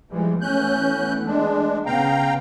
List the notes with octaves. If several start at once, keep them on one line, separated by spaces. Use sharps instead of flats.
E3 F3 G3 G#3
E3 A3 B3 C#4 F#6 G6
G#3 D4
C#3 B3 F5 G5 A#5